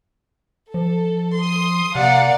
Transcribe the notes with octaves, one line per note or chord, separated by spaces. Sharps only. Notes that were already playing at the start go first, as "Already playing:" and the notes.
F3 A4
C6 D#6
C3 A#3 D5 F5 F#5